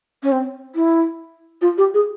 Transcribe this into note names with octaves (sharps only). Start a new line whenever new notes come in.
C#4
C4
E4
F4
G4
G#4